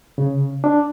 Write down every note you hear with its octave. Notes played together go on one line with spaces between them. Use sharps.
C#3
D4